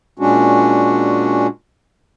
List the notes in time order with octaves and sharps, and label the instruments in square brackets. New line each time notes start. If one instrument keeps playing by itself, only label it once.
[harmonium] A#2 G#3 C#4 D4 F#4